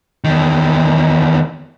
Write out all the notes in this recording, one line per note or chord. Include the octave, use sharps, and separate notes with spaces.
E2 D#3